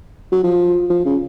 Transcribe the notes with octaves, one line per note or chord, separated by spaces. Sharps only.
F#3
F3
F3
C#3